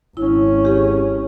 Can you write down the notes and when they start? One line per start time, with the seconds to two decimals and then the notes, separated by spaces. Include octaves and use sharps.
0.17 G#1 C#4 E4
0.65 G4 G#4